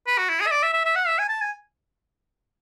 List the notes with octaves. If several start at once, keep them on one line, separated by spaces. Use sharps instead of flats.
B4
F#4
E4
G#4
E5
D5
E5
E5
E5
F#5
E5
G#5
A5
G#5